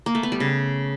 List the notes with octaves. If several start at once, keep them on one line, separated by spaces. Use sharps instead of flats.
A#3
A3
B3
G3
C#3